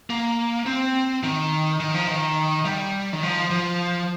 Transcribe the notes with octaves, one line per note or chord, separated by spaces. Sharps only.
A#3
C4
D#3
D#3
F3
D#3
G3
D#3
F3
F3